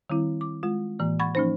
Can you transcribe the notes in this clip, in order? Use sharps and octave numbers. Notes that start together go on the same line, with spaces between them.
D#3 G3 C4 E4
D6
G#3 F4
A2 E3 A#3
F#5 B5 C#6 G#6 A6
F3 A#3 C#4 D#4 C5